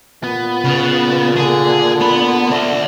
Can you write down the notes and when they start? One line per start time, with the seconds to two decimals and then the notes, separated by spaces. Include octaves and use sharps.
0.23 A#2 B3
0.64 C#3
1.36 D3 G#4
2.00 B3 B5
2.51 D5 E5